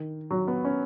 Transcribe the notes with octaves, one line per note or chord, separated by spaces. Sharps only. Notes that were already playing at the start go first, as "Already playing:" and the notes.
Already playing: D#3
F#3
B3
C#4